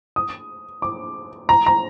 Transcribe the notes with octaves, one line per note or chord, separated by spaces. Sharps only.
D#6
D6
A#5
A#5